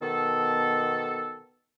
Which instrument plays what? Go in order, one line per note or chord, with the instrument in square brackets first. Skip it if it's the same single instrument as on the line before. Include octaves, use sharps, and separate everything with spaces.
[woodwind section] B2 D#3 B3 A4